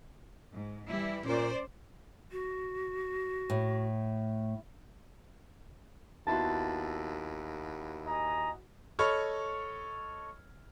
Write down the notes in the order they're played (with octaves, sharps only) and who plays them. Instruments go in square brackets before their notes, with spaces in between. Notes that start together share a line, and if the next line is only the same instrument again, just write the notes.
[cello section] G#2
E3 G3 E4
[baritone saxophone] A#2 [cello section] C#4 C5 D5
[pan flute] F#4
[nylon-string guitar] A2
[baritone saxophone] D#2 [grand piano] B3 E4 F#4 [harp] A5 C6
[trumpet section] D#5 G#5 A#5
[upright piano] A4 C#5 D#5 B5 C#6 F6